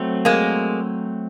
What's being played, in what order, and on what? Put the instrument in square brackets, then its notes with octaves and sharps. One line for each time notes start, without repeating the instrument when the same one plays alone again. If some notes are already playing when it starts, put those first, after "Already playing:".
Already playing: [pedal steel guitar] F#3 A3 C4
[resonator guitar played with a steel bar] G#3 A#3